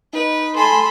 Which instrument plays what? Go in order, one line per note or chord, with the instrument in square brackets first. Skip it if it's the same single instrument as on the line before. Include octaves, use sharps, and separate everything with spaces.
[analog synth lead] D#4 [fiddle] B4
[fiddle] A4 B5 [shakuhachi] G#5 [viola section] C6